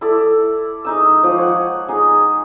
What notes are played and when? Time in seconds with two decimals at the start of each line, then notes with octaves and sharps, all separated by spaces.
0.01 E4 A4 D5
0.85 G#3 D#4 E6
1.23 F3 D5 D#6
1.38 C#5 F#5
1.88 D#4 G#4